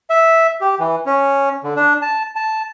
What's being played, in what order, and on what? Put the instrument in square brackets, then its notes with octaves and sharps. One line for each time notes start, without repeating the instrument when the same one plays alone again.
[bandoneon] E5
G4
E3
C#4
D3
D4
A5
A5